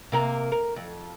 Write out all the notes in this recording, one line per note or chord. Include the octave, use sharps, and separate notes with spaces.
C3 A#3 A#4
A#4
F2